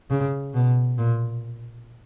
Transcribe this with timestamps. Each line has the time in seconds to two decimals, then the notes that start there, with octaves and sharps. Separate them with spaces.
0.10 C#3
0.54 B2
0.98 A#2